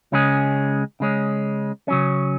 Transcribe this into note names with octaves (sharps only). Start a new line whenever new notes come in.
C#2 C#3 G#3 C#4 G#4
C#3 G#3 C#4
C#3 F#3 C#4